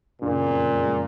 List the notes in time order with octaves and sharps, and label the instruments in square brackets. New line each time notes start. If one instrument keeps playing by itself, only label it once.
[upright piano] F#1 [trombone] A#2
[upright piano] F2
G#3